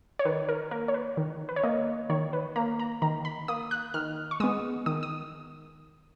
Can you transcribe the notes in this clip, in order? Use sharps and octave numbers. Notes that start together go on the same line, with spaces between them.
C#5
D#3 B4
A#4
A#3 A#4
C#5
B4
D#3
B4
C#5
A#3 D#5
D#3 C#5
B4
A#3 A#5
A#5
D#3 A#5
B5
A#3 D#6
F#6
D#3 F6
C#6
G#3 B3 D#6
D#3 D#6
D#6